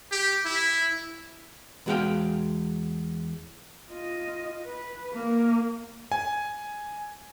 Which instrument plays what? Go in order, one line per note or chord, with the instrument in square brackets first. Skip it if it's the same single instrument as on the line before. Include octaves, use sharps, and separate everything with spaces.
[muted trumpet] G4
E4
[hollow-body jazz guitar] E2 G#3 F#4 G#4 F5 G5
[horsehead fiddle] F4 D#5
B4
A#3
[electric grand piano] G#5